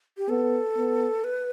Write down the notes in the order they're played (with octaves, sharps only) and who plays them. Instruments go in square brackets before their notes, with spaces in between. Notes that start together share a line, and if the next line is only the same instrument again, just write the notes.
[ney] G4
[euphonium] B3 [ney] A4
[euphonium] B3
[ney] B4